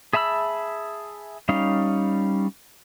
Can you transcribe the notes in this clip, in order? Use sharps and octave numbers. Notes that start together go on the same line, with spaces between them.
G#4 E5 A5 B5 E6
G3 C#4 D#4 F5